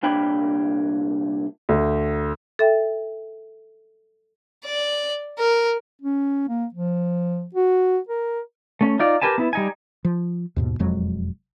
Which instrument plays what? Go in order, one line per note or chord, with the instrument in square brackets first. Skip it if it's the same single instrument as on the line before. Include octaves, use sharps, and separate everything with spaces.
[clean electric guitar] C2 A#2 D4 C#5 G5 B5
[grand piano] D2
[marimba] A4 E5 G5
[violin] D5
A#4
[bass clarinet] C#4
A#3
F3
F#4
A#4
[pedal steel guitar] A3 C#4
D#4 F4 D5
G4 A#4 B4 G#5 A5
B3 E4
G3 D#4 G#5
[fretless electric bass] F3
D#2 G#2 B2
E1 F2 F#3 G#3